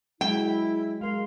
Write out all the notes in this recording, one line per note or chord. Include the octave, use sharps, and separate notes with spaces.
F#3 G#3 E4 G5
G#3 A#4 F5 C6